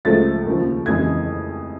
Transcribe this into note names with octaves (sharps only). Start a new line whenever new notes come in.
C#2 C#3 F3 A3 A6
D#2 C#3 F3
F2 C#3 E3 G#3 G#6